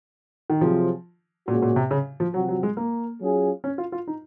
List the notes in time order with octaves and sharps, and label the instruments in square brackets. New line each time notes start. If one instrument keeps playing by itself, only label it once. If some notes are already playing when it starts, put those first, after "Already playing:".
[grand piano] D#3
[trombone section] C3 F#3 C4 F4 G#4 [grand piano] F3
[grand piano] A#2 [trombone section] C#3 G#3 C#4 F#4
[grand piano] A#2
C3
C#3
F3
[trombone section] C3 F3 C4 F#4 [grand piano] F#3
[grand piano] F#3
G#3
A#3
[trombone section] F#3 C#4 F4 G#4
[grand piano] C#4
F4
F4
D#4